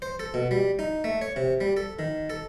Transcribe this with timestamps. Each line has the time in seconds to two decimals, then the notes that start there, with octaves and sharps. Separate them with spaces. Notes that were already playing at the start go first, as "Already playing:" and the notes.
0.02 C5
0.19 A4
0.34 B2
0.51 G3
0.79 D#4
1.04 A3
1.21 C#5
1.36 C3
1.61 G3
1.77 A4
1.99 D#3
2.30 A4